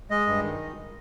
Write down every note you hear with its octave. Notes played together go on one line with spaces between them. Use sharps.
G#3 D#5
G2
D#3